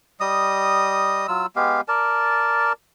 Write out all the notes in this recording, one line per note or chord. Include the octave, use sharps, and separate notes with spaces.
G3 D#5 D#6
F#3 F4 E6
G#3 B3 G4 F5
A#4 D5 A5